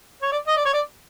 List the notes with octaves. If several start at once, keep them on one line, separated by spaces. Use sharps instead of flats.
C#5
D5
D#5
D5
C#5
D5